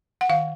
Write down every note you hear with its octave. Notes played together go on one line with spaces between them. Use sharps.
F#5
D#3 F5